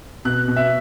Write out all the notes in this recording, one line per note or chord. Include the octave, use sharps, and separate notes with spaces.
B2 F#6
B2
E5